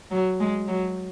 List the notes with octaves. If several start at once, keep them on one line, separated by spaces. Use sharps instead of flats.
F#3
G#3
F#3